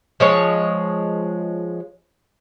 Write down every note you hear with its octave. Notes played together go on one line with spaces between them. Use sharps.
F3 G#3 C#5